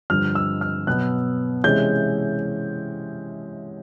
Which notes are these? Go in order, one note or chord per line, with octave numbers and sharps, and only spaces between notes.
G2 D3 F3 F6
E6
F6
B2 F#3 B3 F#6
C3 E3 G#3 C#4 G6